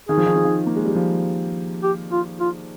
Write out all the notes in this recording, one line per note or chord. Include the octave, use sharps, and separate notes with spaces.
D#3 G#4
F3
D#3
F3
D#3
A#3
G#3
G3
F3
G4
F4
F4